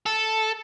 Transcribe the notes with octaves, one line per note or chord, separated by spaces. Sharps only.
A4